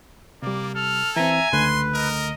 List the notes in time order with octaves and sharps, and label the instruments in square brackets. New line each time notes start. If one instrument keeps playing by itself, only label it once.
[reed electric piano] C3 G3 [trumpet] A#3 [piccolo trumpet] D5
[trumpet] A4 [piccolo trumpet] F6
[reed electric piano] E3 C4 [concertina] E5 A#5 [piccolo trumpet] G#5
[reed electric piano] C#2 D3 A3 [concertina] B4 [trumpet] C6
[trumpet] A#4 [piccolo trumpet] D#5